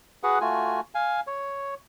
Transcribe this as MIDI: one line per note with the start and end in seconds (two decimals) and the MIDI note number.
0.23 0.39 66
0.23 0.39 68
0.23 0.39 71
0.23 0.39 78
0.41 0.80 57
0.41 0.80 65
0.41 0.80 66
0.41 0.80 80
0.95 1.20 77
0.95 1.20 80
1.27 1.75 73